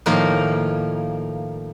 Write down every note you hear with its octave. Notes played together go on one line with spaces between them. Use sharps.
A2 D#3 F3 A#3 A#4